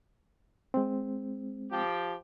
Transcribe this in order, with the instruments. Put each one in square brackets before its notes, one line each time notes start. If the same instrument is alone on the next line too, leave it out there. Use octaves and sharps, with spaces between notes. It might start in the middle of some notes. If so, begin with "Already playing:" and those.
[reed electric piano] G#3 C4
[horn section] F3 G4